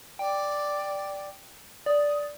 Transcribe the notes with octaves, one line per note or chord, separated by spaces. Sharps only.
D5 G5
D5 D#6